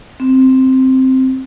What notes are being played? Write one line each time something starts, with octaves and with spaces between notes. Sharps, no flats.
C4